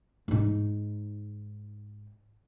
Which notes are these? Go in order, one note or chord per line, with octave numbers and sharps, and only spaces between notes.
G#2 D#4